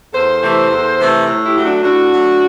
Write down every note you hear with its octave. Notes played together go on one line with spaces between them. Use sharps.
E2 A4 C5
C3 E3 A3
E2
C3 E3 A3
A2
E4 G4
F#3 A3
D4 F#4
A2 D4 F#4
F#3 A3